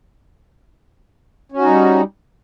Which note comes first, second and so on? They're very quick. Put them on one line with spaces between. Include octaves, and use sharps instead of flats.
C#4 F#4 D#4 G3